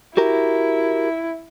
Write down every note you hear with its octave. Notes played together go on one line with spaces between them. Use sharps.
E4 F#4 G4 A#4